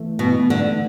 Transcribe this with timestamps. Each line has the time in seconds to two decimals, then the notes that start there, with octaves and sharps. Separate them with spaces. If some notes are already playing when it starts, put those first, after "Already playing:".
Already playing: E3 A3
0.19 B2 E3
0.50 D3 A3